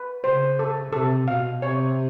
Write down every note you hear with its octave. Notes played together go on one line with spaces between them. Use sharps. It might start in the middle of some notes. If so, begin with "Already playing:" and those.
Already playing: B4
C#3 C5
A4
C3 A4
B2 F5
C3 C#5